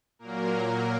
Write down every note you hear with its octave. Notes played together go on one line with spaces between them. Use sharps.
A#2 F#3 A#3 A#4